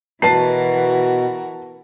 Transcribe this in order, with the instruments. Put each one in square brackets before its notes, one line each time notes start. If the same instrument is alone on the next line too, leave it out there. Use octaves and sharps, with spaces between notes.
[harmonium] B2 [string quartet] E3 F#4 A#4 [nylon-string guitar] B3 B4 [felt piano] A5 C7